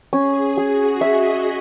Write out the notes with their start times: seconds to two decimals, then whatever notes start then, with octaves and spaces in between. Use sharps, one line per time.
0.13 C#4 G#4
0.57 F#4 G#4
1.01 D#5 E5